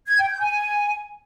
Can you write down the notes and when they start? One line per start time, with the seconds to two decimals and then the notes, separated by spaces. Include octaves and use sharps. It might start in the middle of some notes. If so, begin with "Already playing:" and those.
0.07 G#6
0.18 G5
0.30 G6
0.41 G#5